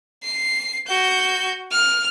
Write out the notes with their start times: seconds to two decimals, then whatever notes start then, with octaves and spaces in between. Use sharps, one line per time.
0.24 C7
0.87 F#4 G6
1.72 F6